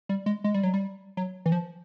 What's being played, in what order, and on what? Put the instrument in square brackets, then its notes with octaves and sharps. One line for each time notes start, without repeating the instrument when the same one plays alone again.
[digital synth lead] G3
G#3
G#3
G3
F#3
G3
F#3
E3
F3